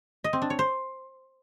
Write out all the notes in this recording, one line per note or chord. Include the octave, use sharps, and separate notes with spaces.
D#5
C4
D4
C#5
C5